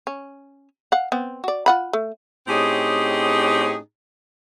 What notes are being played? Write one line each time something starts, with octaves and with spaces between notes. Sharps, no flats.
C#4
F5 F#5
B3 C4
F#4 D5
F4 F#5 B5
A3
A2 C4 C#4 D#4 G4 G#4